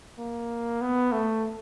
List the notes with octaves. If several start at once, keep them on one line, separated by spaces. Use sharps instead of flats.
A#3
B3
A3